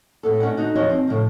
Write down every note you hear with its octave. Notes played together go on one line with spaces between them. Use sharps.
A2 B3 A4
A3 C#4 D5 D#5 F#5
D3 D#4 F#4
E2 F3 D#4 F#4 C#5 D#5
C4
A2 C#3 F3